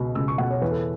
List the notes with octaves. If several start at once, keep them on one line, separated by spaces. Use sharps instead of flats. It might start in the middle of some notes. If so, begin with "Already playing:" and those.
Already playing: C#2 B2
C#2 E6
C#6
B2 F#5
C#5
E2 B4
A4